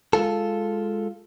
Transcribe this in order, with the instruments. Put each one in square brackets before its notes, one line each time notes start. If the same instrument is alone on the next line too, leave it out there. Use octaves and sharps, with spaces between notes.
[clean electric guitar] G#3 F4 A4